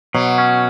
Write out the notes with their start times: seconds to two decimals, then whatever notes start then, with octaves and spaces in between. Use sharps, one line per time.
0.14 B2 F#3
0.38 C#4